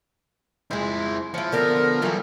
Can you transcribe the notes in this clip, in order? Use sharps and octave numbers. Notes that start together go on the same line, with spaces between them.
F2 G#3 E4 C5
F3 E4 C#5
D3 B3 A4 A#4
E3 F#3 G3 E4 F4